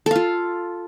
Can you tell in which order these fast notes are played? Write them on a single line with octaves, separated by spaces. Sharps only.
A4 F5 F4